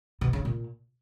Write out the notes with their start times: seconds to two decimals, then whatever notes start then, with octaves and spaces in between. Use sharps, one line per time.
0.21 B2
0.33 C#3
0.45 A#2